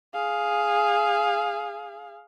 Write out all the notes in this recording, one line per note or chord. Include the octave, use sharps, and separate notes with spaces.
G#4 F5